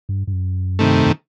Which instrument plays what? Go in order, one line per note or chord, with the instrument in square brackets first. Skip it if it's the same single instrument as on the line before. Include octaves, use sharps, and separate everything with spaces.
[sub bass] G2
G2
F#2
[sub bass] G2 [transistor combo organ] C3 D#3 A3
[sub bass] F#2
F#2